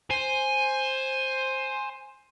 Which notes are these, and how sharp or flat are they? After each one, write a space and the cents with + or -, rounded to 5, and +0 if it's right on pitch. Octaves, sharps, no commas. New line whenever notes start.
C5 +10 G#5 +0